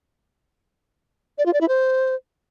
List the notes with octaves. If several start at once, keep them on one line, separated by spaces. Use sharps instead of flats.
D5
F4
D5
E4
C5